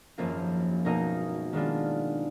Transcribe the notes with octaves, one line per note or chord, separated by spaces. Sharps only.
G#1 F#2 F3 A#3 F4
B2 A#3 D#4 A#4 D#5
D#3 G#3 B3 D4 F4